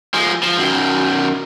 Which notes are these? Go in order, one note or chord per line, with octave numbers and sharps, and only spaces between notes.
F3 G#3
F3
F#2 D#3